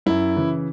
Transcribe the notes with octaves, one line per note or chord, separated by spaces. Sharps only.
F#2 E4
C#3 E3